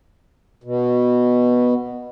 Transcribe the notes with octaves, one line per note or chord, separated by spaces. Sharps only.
B2